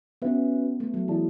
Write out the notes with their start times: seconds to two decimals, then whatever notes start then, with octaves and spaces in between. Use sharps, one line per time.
0.22 B3 C#4 F#4 B4 E5
0.80 A3
0.94 F#3
1.08 E3 E4 G#4 D5 A5